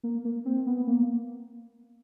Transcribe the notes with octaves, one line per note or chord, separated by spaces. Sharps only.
A#3
A#3
C4
B3
A#3